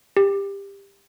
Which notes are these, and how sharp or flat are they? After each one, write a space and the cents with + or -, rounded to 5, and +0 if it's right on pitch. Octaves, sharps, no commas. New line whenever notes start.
G4 +20